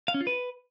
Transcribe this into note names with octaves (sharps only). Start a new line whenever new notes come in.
F5
C#4
F4
B4